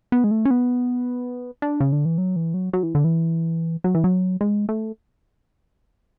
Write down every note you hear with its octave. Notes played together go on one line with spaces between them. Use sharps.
B3
G#3
A3
C#4
B3
D4
C#3
D3
E3
F#3
E3
F#3
F#3
E3
D3
E3
F#3
E3
F#3
G#3
A3